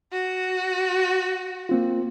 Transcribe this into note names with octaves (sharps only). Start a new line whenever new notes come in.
F#4
A#3 C4 F4